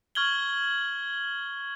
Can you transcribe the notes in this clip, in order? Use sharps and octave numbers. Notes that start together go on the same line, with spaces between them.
C#6 F6 G#6 F#7 G7